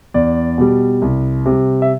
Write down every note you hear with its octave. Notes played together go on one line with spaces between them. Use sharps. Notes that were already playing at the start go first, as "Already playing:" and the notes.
E2 D5
B2 G3
C2
C3
G3
E5